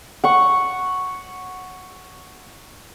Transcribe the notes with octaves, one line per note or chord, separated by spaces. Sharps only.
F#5 C#6